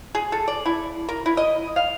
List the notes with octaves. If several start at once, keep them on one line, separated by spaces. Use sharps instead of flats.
G#4
A4
D5
E4
A#4
E4
D#5
F5